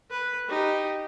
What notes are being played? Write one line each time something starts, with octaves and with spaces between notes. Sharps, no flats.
B4
D#4 G4